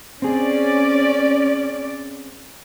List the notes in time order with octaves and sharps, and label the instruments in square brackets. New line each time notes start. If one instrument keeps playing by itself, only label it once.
[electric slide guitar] C4 G#4 [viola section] C#4 D5